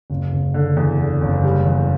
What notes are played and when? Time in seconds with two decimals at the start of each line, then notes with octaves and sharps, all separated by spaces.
0.10 F#1
0.32 F#1
0.54 D3
0.77 E2
0.99 D3
1.21 F#1
1.44 G3
1.66 E2